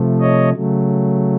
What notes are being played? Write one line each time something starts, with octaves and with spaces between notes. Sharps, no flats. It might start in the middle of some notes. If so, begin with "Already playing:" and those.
Already playing: C3 F3 A3
C#5 D#5
C#3 F#3 A3